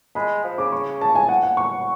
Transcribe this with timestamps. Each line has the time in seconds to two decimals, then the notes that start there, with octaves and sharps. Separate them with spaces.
0.15 G#3 B5
0.44 F3
0.58 C#3 D6
0.72 C#6
1.01 A5
1.15 G#5
1.29 F#5
1.43 F#5
1.57 C#6